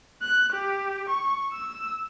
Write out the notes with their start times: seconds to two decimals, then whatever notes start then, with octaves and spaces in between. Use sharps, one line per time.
0.22 F#6
0.53 G4
1.10 C#6
1.53 E6